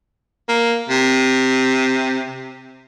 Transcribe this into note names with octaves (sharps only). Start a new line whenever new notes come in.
A#3
C3